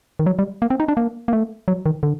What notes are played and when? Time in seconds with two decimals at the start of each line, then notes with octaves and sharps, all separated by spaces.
0.19 D#3
0.26 F#3
0.39 G3
0.62 A#3
0.70 C4
0.80 D#4
0.88 D4
0.97 A#3
1.28 A#3
1.33 A3
1.68 F#3
1.86 D#3
2.03 D3